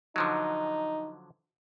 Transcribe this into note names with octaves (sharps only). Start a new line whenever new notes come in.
D3 F3 F#3 D#4